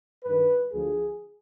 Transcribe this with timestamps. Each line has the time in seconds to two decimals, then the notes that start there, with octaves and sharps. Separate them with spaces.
0.24 G2 D#3 B4
0.73 D2 D3 F3 G#4